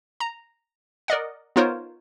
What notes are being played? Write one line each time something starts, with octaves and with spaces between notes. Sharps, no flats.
A#5
A#4 D5 D#5 F#5
B3 D#4 F4 A#4 C5 C#5